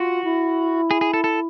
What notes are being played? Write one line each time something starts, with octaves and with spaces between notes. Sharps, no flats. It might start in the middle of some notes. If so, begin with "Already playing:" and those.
Already playing: F4 F#4
E4
G#4
G#4
A4
A4